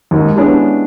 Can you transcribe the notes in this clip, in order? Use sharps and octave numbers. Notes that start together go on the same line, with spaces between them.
D#2 G#2
G#3 B3 C#4 D4 E4 G4